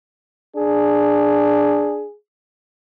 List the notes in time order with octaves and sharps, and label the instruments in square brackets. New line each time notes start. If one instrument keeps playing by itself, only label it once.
[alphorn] D4 [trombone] G#4